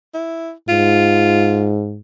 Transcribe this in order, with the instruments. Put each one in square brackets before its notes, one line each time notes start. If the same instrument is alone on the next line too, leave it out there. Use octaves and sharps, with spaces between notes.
[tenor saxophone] E4
[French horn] G#2 [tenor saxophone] F4